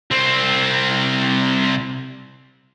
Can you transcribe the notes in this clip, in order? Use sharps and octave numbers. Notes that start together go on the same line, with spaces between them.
C2 C4